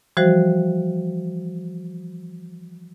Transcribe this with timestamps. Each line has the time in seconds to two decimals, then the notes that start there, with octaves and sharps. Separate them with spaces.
0.17 E3 F3 G3 F#4 C5